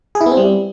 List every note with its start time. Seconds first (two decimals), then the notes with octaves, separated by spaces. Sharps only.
0.15 G#4
0.21 E4
0.26 B3
0.32 C4
0.37 G3